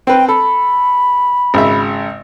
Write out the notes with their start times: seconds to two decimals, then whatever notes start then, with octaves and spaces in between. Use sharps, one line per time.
0.07 C4 B4 G5
0.29 A4 B5
1.54 G#1 C#3 E5